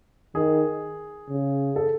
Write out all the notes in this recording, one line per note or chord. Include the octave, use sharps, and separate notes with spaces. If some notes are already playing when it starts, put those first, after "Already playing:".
D#3 G#4
C#3
A4